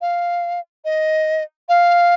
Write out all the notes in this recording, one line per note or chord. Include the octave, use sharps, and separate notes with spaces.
F5
D#5
F5